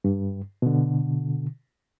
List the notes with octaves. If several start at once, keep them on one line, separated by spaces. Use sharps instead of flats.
G2
B2 D3